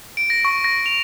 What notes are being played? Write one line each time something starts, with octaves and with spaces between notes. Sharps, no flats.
D7
A#6
C#6
A#6
F7